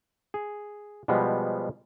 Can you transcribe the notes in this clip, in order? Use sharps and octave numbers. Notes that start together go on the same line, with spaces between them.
G#4
B2 F3 G3 G#3 B3